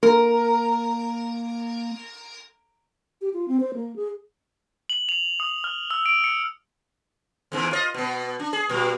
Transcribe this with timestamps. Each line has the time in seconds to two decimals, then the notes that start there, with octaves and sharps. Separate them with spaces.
0.03 A#3 A#4
3.21 G4
3.34 F4
3.48 C4
3.60 C5
3.74 A#3
3.96 G#4
4.90 F#7
5.09 F7
5.40 D#6
5.64 F6
5.91 E6
6.06 D7
6.24 C#7
7.52 E2 G#2 E3
7.71 F4 C#5 D#5
7.94 B2 B3
8.40 D4
8.53 G#4
8.69 A#2 G3